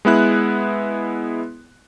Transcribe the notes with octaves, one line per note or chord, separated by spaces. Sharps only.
G#3 B3 E4 F#6